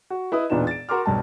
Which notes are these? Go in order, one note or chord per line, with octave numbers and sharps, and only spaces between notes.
F#4
E4 B4 D#5 D#6
E1 A#2 B3 D4 D#4 E7
A6 D7
F#4 A#4 C6 D6 F6
B1 G2 A5